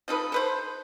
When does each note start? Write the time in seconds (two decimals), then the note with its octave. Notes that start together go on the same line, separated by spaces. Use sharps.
0.08 F3 D#4 A4 B4
0.32 A4 B4 C5